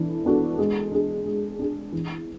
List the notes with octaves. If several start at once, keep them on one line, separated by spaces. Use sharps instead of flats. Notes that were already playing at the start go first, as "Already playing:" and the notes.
Already playing: E3 D4 A4
B3 D4 F#4 A4
G#3
D4 G#4
G#3
D4 G#4
E3